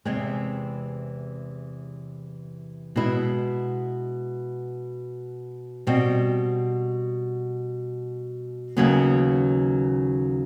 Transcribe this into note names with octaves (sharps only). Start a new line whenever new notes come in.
E2 C3 E3 G#3 C4
B2 G#3 B3 E4
B2 G3 C4
D#2 C#3 F#3 B3